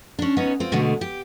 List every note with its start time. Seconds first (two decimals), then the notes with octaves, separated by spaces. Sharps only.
0.19 C#4 D4
0.37 B3 C#4 D#4 C#5
0.60 C4 F4
0.72 B2 D3 G#3 A3
1.01 G4